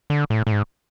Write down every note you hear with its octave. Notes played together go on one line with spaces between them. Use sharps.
D3
A2
A2
G#2